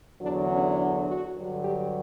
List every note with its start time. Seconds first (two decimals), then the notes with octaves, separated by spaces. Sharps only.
0.21 E2 D3 F#3 D4
0.50 C#4
0.78 D4
1.07 F#4
1.36 G2 D3 F#3
1.64 G4